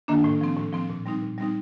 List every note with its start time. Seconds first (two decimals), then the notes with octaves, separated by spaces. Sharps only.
0.08 D#3 A#3 D4
0.24 A2
0.41 F3 C4
0.57 A2
0.73 F3 C4
0.90 A#2
1.06 G3 C4 D#4
1.22 A#2
1.38 G3 C4 D#4